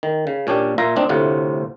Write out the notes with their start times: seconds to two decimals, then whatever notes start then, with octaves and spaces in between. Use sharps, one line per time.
0.03 D#3
0.27 C#3
0.47 A#2 C#4 D4 G4
0.78 A#2 F4 E5 F5 A#5
0.96 C4 D4 D#4
1.09 D2 A2 C3 F4 F#5